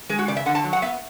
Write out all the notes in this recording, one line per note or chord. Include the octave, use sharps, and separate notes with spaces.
G#3 G#4
F#4
C#3 D5
E5
D3 F#5
A5
F#3
F#5
B3 E5